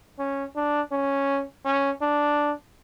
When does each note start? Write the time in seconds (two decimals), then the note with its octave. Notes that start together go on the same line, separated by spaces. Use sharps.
0.19 C#4
0.56 D4
0.92 C#4
1.65 C#4
2.02 D4